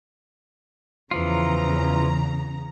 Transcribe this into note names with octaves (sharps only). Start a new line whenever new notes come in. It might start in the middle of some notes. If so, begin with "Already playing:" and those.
E2 C#3 E3 F3 F4 A#5